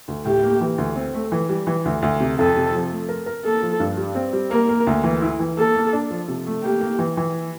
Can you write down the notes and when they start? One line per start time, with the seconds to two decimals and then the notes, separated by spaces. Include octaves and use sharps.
0.08 D2
0.25 A2 G4
0.43 A#3
0.61 E3
0.78 D2
0.96 C4
1.14 A3
1.32 E3
1.49 G3
1.67 E3
1.85 D2
2.02 D2
2.20 C3
2.38 F2 A4
2.56 C3
2.74 F3
2.91 A3
3.09 A#4
3.26 A#4
3.44 A#3 A4
3.62 F3
3.80 G2
3.97 G3
4.15 C4
4.33 G3
4.51 A#3 A#4
4.69 A#3
4.87 D2
5.04 E3
5.22 E4
5.39 E3
5.57 A#3 A4
5.75 A#3
5.93 D4
6.11 F3
6.28 C3
6.46 A3
6.63 A#3 G4
6.81 A#3
6.99 E3
7.17 E3